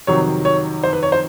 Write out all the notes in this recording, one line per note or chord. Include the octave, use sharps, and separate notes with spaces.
F2 C3 D#3 F#3 C#5
C#5
C5
B4
C#5
C5